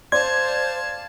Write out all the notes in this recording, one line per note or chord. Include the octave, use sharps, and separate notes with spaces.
C5 D5 F5 A5 C6 G#6